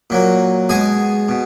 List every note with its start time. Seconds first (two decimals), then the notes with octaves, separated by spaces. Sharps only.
0.10 A#2 F#3 A#3
0.69 B2 G#3 G#4 G#5
1.28 B2